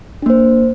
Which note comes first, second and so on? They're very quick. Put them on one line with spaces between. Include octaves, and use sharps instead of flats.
D4 A#3 C5